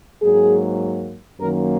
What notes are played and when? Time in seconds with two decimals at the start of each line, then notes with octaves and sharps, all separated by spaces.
0.22 G#2 F#3 A#3 G#4
1.41 F#2 D#3 F#3 A#3 A#4